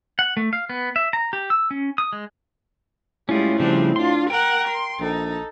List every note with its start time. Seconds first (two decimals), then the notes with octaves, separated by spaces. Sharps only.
0.19 F#5
0.37 A3
0.53 F5
0.69 B3
0.96 E5
1.13 A#5
1.33 G4
1.50 E6
1.71 C#4
1.98 D#6
2.13 G#3
3.29 A2 G3 G#3 C#4 F4
3.60 C#3 F3 G3 C4 D4
3.96 D4 F4 C6
4.30 A#4 F#5 G5
4.68 C6
5.00 A#1 D#4 A4